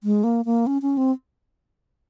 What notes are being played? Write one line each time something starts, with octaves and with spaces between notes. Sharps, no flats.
G#3
A#3
A#3
C#4
C#4
C4